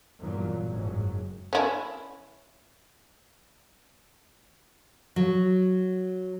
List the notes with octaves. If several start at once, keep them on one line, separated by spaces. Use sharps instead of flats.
E2 G2 A#2 F#3
F#1 G#2 F#3
C#4 E4
F#3